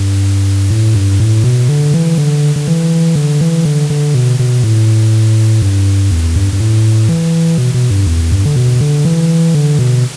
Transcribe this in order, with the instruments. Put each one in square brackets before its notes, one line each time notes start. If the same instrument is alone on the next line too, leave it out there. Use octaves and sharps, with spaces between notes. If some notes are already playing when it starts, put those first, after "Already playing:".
Already playing: [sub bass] G2
A2
G2
A2
B2
D3
E3
D3
D3
E3
D3
E3
D3
D3
B2
B2
A2
G2
E2
G2
G2
A2
E3
B2
B2
G2
E2
G2
D3
B2
D3
E3
D3
B2